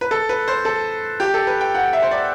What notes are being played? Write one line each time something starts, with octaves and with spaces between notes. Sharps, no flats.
B4
A4
B4
C5
A4
G4
A4
B4
G5
F#5
E5
C5
D5